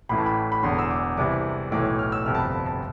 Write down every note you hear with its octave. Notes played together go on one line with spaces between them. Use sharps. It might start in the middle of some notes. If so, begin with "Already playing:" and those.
A1 A2 E3 B5
A5
B5
B5
E1 E2 D3 C6
E6
D6
C2 C3 E3 D6
B1 A2 E3 D6
F6
E6
G1 F2 C3 F6
A5
B5
A5